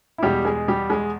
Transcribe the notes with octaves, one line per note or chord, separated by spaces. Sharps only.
E4
E2 B2 G3 G#3 G4
G#3 G#4
G3 G4
G#3 G#4